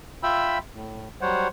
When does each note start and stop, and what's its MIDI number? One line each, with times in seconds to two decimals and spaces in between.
0.23 0.58 65
0.23 0.58 76
0.23 0.58 79
0.23 0.58 83
0.23 0.58 88
0.74 1.09 45
1.21 1.48 54
1.21 1.48 55
1.21 1.48 72
1.21 1.48 73
1.21 1.48 78